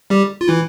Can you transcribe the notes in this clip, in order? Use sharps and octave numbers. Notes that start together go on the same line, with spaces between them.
G3 G4
F4
E3 E4